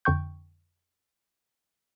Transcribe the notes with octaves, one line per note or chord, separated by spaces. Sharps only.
F2 D3 G5 C#6 G6